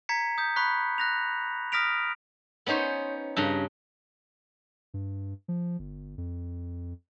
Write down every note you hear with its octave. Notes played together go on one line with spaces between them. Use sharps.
A#5 G#6 B6 C#7
D#6 G6
B5 C#6 F#6 B6
F#6 A#6 F7
D#6 F6 A#6 B6 D7 F7
B3 C#4 D#4 C5 C#5
G2 C#3 A#5
G2
F3
G1
F2